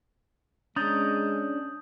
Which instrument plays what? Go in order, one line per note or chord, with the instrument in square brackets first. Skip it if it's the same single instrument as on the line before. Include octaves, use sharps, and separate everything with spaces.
[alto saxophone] G#3 [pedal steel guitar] C#4 D4 A#5 [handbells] D#6 G6 A6